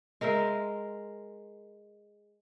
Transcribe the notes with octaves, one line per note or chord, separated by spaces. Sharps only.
G#3 A#4 C5 E5